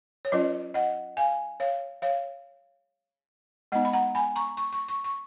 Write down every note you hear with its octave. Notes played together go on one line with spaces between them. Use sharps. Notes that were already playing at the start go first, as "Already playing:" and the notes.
C#5
F#3 C#4 F4 B4 D#5
D#5 F#5
F5 G#5
C#5 F5
C#5 F5
G#3 B3 D#4 D#5 F#5
B5
F#5 A#5
G#5 B5
A#5 C#6
C#6
C#6
C#6
C#6